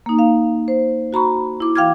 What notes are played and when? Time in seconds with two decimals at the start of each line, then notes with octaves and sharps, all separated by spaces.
0.06 A#3 D#4
0.19 F5
0.68 C5
1.13 F#4 A#5 B5 C#6
1.60 E4 D6
1.76 E3 F5 G5 D6 F6 G#6